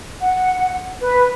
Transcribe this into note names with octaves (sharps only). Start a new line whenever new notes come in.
F#5
B4